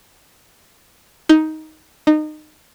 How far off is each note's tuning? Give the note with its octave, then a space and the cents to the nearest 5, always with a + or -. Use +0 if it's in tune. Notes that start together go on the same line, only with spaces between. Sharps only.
D#4 +10
D#4 -25